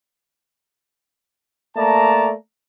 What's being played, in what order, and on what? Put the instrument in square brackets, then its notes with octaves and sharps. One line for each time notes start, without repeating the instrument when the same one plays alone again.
[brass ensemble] A3 A#3 D5 A5 A#5